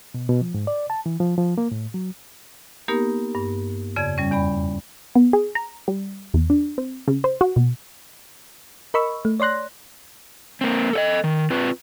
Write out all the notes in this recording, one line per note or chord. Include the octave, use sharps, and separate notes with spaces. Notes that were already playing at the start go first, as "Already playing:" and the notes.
B2
B2
F3
G#2
D5
A5
E3
F3
F3
A#3
A2
F#3
A#3 B3 D#4 G4 A#4
G2
F2 C#3 D5 G#6
G3 C#4
E2 D5 B5
B3
G#4
A#5
G3
E2
D4
C4
C#3
C5
F#4
B2
A#4 D#5 B5 C#6 E6
A3
C#5 D5 C6 F#6 A#6
A#3 C4
A4 C#5 D#5
D#3
C4 F4 B4